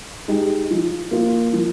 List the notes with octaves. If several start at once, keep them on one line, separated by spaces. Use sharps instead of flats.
G#3 D#4 G4
F3
A#3 F4
F3